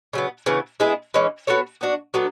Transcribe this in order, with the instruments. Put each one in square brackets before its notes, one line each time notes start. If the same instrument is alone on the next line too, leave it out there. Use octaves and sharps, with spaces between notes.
[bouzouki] C#3 F#3 B3
C#3 E3 B3
G#3 B3 E4 G#4
E3 G#3 C#4
B3 F#4 A4 C#5
B3 D4 F#4
F#3 B3 D4 A4